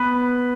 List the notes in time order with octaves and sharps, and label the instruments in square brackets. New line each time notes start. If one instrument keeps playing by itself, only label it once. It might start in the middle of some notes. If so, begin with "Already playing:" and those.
Already playing: [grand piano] B3 B4